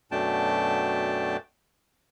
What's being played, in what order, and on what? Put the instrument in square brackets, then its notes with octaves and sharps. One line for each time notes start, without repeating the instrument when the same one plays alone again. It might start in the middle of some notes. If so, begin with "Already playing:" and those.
[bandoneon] F#2 B2 A3 D4 G5 A5